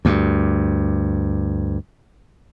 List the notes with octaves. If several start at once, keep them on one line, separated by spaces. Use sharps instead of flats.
D2 G2